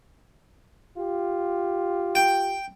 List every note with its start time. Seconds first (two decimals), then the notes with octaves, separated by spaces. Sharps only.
0.97 F4 G4
2.15 G5